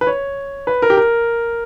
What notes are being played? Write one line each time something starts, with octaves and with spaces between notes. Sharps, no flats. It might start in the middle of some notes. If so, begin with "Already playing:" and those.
B4
C#5
B4
A#4
G4
A#4